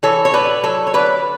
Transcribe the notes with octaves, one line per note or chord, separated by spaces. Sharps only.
E3 A4 C#5
C#5
A2 B4 D5
F#3 A4 C#5
C#5
D3 B4 D5